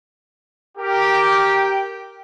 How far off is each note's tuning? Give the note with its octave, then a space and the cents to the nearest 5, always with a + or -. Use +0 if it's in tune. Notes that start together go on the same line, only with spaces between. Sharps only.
G4 -10 A#4 +0 G5 +0